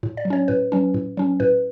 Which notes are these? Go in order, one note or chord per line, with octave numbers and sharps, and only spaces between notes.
A2
D5
F#3
C#4 C#5
A2 B4
F#3 C#4
A2
F#3 C#4
A2 B4